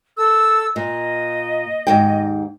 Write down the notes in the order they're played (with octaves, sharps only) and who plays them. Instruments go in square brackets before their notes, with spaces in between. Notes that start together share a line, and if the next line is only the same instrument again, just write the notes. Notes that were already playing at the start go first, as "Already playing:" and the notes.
[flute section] A4 E6
[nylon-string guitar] A#2 [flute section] D#5
[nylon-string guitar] D#2 G#2 G5